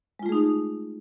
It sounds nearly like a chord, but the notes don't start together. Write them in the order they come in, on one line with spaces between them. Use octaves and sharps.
G#3 F4 A3 G#4 D#4